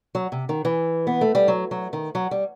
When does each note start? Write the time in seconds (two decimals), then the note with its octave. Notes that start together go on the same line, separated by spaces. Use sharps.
0.15 F#3
0.32 C3
0.49 D#3
0.65 E3
1.07 B3
1.21 A3
1.35 G3
1.48 F#3
1.71 F#3
1.93 D#3
2.15 F#3
2.31 G3